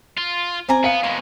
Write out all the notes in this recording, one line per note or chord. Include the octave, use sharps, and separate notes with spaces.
F4
C4 D5 G#5 A#5
B3 F5 C#7
B2 G#3 A#4